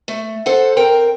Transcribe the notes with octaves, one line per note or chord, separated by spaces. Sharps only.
A3
A4 C5 F#5
C4 A#4 G5